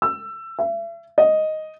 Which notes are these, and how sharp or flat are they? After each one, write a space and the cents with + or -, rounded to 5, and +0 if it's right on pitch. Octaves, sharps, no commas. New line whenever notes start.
E6 +20
E5 +40
D#5 +0